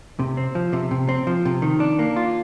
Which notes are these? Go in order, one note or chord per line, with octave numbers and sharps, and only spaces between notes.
C3
C4
F3
C3
C3
C4
F3
C3
D#3
D4
A#3
F4